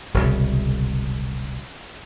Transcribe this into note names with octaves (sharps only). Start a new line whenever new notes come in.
E1 C2 C#3